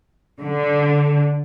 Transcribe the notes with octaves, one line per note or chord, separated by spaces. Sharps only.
D3